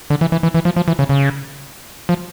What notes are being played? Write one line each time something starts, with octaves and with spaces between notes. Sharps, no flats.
D3
E3
E3
E3
E3
F3
F3
E3
C#3
C#3
F3